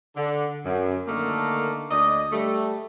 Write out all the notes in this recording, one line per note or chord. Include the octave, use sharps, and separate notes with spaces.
D3
F#2
D3 D#3 A3 A#3
D2 D5 D#5
G3 A3